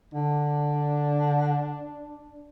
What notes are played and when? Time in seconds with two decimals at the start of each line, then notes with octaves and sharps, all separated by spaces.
0.14 D3 D4